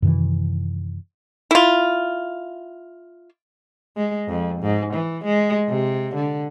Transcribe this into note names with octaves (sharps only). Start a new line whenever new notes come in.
F#2 C3 D#3 E3
E4 F4
G#3
F2
G#2
E3
G#3
C3
D3